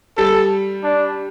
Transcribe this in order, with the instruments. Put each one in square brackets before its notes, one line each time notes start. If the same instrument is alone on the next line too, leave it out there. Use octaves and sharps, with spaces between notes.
[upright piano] G3 [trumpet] A4
[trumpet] D4